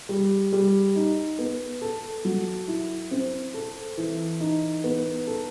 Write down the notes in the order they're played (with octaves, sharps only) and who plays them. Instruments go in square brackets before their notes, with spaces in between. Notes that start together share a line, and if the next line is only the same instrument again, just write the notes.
[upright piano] G3
G3
D#4
B3
A4
F#3
E4
C4
A4
E3
D#4
B3
A4